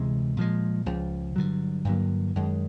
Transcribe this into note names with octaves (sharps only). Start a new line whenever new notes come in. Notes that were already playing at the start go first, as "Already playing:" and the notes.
Already playing: D2 C3 E3 G#3
A#2 F3 G#3
C#2 C#3 F3
G2 D3 F#3
G2 D3 F#3 A#3
F#2 D#3 G#3